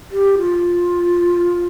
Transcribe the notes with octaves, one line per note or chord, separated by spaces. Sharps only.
G4
F4